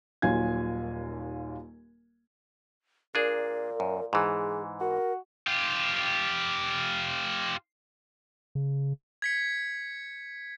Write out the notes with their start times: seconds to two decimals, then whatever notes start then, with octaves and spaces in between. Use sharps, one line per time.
0.22 D#1 D#2 F#3 F4 G#5 G#6
3.15 A#2 D4 G#4 A#4
3.80 F#2
4.13 G#2 E3 G#4
4.81 F#4 A#4
5.47 F4 G4
8.55 C#3
9.22 G#6 B6 C#7